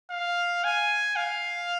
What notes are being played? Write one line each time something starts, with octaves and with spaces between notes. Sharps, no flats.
F5
G#5
F5